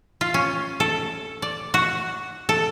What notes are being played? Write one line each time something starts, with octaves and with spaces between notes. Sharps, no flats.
F4
C#4
A4
D5
F#4
A4